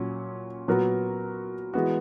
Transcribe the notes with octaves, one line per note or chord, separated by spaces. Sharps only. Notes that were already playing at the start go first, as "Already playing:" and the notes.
Already playing: A#2 F#3 C#4
A#2 F#3 B3 F#4 A#4
E3 G#3 B3 F#4